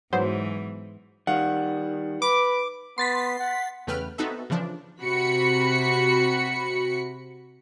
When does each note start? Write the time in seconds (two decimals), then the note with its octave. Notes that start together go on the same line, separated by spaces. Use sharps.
0.13 G#2 E3 F#3 B3 C5
1.27 D#3 G3 F5 F#5
2.22 B4 D6
2.98 B3 C6 A6 B6
3.39 F#5
3.87 E2 C#3 A3 B4 G5 F6
4.18 B3 C4 D#4 F#4 A4 E5
4.50 C#3 E3 F3 D4
5.02 C3 F#4 B5 C#7